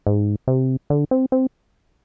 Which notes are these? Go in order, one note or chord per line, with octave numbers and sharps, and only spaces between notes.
G#2
C3
D3
C4
C4